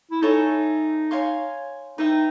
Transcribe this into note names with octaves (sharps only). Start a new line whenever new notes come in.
E4
D#4 A4 C#5 E5 G#5
C#5 F5 G#5 C6
D#4 B4 E5 G5